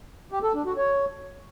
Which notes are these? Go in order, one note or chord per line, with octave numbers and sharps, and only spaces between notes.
G4
A4
D4
F#4
C#5